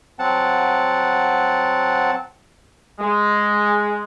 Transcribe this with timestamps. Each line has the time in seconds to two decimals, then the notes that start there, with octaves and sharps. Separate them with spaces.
0.19 F#3 C4 F#5 A5
2.99 G#3